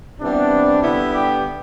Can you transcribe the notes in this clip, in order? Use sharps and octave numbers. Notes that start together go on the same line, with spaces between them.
C3 E3 G3 B3 D4
D3 G3 B3 E4
G4